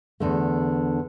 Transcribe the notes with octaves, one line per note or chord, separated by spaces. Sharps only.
E2 D3 A3